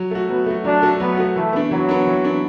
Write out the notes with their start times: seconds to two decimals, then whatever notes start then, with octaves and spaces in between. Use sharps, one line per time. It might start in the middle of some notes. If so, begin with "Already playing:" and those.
Already playing: F#3
0.11 A3 F#4
0.29 F#3 B3
0.46 A3 F#4
0.64 F#3 D4
0.82 A3 F#4
1.00 F#3 B3
1.17 A3 F#4
1.35 E3 A3
1.53 B3 D4
1.71 E3 F#3
1.89 B3 D4
2.07 E3
2.25 B3 D4